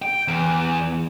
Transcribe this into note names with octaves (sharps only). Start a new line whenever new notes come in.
G5
E2